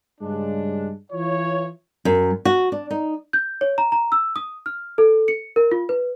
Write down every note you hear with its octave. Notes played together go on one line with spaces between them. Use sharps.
G2 C#3 G#3 D4
E3 F4 C#5
F#2
F#4
D4
D#4
G6
C#5
A#5
A#5
E6
D#6
F6
A4
C#7
A#4
F4
B4